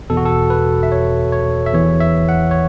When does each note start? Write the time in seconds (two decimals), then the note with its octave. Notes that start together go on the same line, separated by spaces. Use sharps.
0.10 E2 B2 A4
0.17 F#4
0.26 A4
0.50 B4
0.83 E5
0.92 C#5
1.32 C#5
1.66 E5
1.73 E2 E3 C#5
2.00 E5
2.29 F#5
2.51 C#5